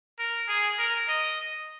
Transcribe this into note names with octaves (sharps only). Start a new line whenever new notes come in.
A#4
G#4
A#4
D#5